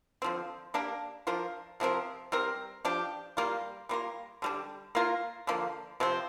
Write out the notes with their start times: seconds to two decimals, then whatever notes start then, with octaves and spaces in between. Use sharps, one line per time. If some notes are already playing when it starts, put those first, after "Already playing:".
0.22 D3 F3 C4
0.74 A#3 D4 G4 A#4
1.27 F3 D4 F4 A#4
1.80 C3 F3 C4 A#4
2.32 G3 C4 A#4
2.85 F3 D4 G4
3.37 G3 A#3 F4
3.89 G3 A#3 F4 A#4
4.42 D3 G3 D4
4.95 A#3 F4 A#4
5.47 D3 F3 A#3
6.00 C3 F3 C4